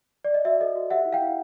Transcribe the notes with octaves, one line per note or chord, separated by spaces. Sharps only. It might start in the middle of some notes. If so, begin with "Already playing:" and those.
D5
D#5
F#4 D5 E5
A4 D#5
F#4
G4 E5 F#5
E4
F5 G5
E4